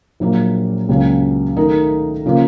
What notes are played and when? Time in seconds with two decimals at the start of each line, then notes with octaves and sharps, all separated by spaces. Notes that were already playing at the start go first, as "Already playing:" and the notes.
0.20 A#1 A#2 F#3 A#3
0.89 C#2 C#3 F#3 A#3 C#4
1.57 D#3 A3 D#4 A#4
2.26 C#3 F3 A#3